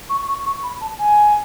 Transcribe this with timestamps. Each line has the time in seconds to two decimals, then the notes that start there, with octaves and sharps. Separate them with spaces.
0.09 C#6
0.26 C#6
0.44 C#6
0.62 B5
0.80 A5
0.99 G#5